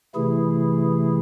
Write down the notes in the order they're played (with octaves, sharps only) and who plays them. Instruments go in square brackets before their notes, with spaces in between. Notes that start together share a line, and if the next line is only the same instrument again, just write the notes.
[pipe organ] C3 E3 A3 E4 G#4